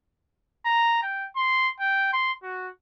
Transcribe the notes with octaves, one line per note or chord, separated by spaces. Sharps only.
A#5
G5
C6
G5
C6
F#4